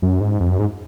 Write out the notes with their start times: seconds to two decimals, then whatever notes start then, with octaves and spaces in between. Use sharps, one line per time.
0.02 F#2
0.20 G#2
0.40 F2
0.49 F#2
0.59 G#2